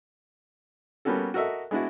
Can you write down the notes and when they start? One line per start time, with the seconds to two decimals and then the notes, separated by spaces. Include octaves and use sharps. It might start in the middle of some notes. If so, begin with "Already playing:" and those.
1.05 G3 A#3 B3 C#4 F#4 A4
1.34 F#4 A4 A#4 D#5 E5
1.71 G#3 B3 D4 E4 F#4